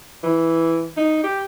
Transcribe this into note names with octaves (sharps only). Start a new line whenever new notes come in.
E3
D#4
G4